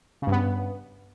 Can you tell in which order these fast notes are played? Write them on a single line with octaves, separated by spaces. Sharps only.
C#3 G2 B3